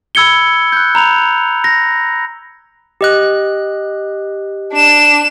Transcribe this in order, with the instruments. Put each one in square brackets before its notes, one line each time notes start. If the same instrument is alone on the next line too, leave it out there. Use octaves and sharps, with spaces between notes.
[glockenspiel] B5 E6 G#6 C#7 G7
F#6 G6
A#5 B5 F7
A#6
[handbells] G4 D#5 F#6
[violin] D4 E7